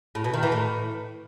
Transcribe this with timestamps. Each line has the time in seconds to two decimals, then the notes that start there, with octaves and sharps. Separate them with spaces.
0.15 A2
0.24 B2
0.34 D#3
0.43 E3
0.52 A2